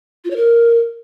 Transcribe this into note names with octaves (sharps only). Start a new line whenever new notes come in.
F4
C#5
A#4